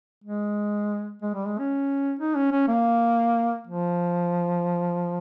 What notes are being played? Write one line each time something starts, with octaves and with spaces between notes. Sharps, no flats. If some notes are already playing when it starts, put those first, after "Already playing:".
G#3
G#3
G3
G#3
C#4
D#4
C#4
C#4
A#3
F3